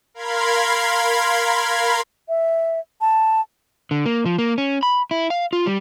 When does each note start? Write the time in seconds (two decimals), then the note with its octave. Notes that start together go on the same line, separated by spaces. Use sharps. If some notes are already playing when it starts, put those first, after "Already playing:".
0.14 A#4 F5 B5 C6 G#6
2.29 E5
3.01 A5
3.91 D3
4.06 A#3
4.26 F3
4.39 A#3
4.58 C#4
4.83 B5
5.11 E4
5.30 F5
5.53 F4
5.66 G3